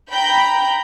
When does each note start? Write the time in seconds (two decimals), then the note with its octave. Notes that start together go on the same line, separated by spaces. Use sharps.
0.11 G5 A#5 B5 G6